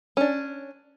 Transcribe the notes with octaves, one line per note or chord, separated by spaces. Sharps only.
C#4 D4